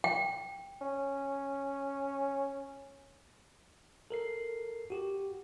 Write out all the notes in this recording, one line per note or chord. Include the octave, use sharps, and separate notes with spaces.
G5
C#4
A4 A#4 C7
F#4 G4